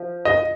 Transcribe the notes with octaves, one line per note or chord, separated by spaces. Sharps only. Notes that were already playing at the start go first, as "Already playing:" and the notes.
Already playing: F3
D#5